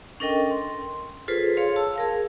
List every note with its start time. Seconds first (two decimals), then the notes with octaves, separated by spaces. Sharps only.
0.20 C#4 D4 A4 A#4 D#5 G5
0.51 C6
1.28 F4 G#4 A4 B4 C5
1.57 G#4 C#5 F5 C6
1.76 A5 E6
1.96 G#4 A#4 F5